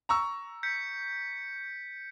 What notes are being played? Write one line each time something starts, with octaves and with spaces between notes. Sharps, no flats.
A#5 C#6 E6
G6 B6 C#7